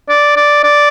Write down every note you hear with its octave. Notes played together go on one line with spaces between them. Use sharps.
D5
D5
D5